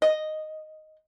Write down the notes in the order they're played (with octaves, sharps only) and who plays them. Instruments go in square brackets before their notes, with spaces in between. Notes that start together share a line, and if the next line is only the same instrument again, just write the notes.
[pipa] D#5